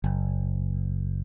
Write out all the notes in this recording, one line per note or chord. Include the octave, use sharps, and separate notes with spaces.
F#1